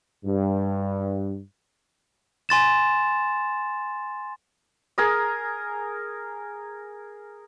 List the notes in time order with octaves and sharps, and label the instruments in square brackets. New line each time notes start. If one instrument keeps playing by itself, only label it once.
[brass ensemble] G2
[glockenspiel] G#5 C6 A6 E7
[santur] G#4 A#4 D#6